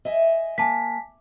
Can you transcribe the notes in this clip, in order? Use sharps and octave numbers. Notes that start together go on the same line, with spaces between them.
D#5 E5 G#5
A#3 G#5 A5 B6